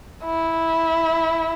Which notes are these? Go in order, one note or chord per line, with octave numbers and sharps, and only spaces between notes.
E4